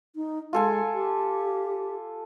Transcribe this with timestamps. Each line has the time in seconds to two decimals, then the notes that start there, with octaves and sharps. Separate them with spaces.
0.16 D#4
0.53 G#3 F4 A4 G#5
0.94 G4